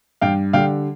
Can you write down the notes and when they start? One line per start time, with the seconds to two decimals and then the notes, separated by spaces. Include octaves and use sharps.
0.21 G2 F5 G5
0.53 D3 G3 F5 G5